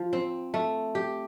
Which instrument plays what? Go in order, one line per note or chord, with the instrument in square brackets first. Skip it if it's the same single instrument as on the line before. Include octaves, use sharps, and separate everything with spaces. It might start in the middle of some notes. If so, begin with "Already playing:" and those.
Already playing: [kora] F3
C4
A3
G4